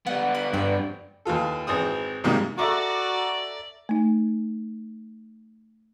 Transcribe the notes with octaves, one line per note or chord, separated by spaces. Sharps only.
G3 B3 F#5
B5
G2 C5 D5 G5
D#2 E3 F4 A4
G#1 E3 C4 D#6
G#2 C3 D#3 G3 A#3
F#4 A4 D5 E5 A#5 D6
A3 D#4